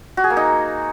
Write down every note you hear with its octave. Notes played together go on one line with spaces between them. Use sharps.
F#4
G#4
A#3
D#4